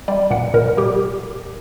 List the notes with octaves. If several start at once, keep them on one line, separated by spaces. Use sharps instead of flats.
G3 D5
A#2 F#5
A#2 A#4
G3 G4